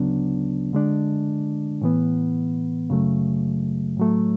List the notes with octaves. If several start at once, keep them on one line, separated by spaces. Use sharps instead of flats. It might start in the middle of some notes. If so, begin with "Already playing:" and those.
Already playing: D2 C#3 F#3 B3 D4
D3 G#3 D4
A2 E3 B3
F#2 C#3 F#3 A3
A2 F#3 A3